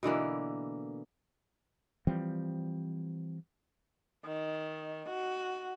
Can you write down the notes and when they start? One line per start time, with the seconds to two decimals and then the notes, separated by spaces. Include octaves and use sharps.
0.03 B2 D3 E3 A#3
2.07 E3 F3 G3 C4
4.25 D#3
5.09 F#4